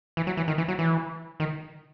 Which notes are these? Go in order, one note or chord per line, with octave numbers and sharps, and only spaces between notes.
E3
F#3
E3
D#3
E3
F#3
E3
D#3